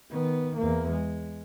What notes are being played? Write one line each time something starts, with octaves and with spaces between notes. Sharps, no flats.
D#3 B3
E2 A#3
G#3